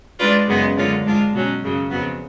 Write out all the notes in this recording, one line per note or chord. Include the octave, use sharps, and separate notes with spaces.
G#3 D4 F4 B4 D5
F#2 C#3 G#3 B3
F#2 D3 G#3 C#4 F4
G#2 G#3 D4 F4
B2 F#3 C#4
F#2 C#3 F#3
F2 C#3 F#3 B3